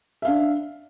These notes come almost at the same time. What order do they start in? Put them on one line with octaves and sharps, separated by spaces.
E5 F5 D4